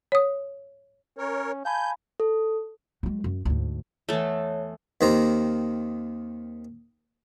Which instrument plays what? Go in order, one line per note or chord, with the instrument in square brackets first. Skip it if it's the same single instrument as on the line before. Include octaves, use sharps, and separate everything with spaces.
[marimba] C#5 D#6
[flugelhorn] C#4 [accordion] A#4 C#5
[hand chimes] F5 A5 B5 [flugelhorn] G#5 [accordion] G6
[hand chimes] A4
[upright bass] F#3 G#3
F#2
D2 G#2
[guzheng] E2 E3 [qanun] A3 A4 [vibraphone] C#5
[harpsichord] D#2 D#3 C4 A#5